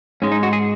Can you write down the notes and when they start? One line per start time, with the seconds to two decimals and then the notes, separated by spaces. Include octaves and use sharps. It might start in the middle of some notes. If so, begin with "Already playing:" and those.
0.22 G#2 G#3 C#4
0.32 D#4
0.43 F#4
0.53 G#4